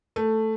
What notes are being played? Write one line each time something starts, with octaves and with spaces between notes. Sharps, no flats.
A3